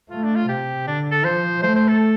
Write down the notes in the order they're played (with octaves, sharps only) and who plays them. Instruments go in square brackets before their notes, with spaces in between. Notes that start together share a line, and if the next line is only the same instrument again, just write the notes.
[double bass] A3 [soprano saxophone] F4
[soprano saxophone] D4
F4
[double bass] C3 [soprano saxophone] G4
[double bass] D3 [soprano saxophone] D4
[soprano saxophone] A4
[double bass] F3 [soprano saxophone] C5
[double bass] A3 [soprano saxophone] C5
[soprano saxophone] C5
A4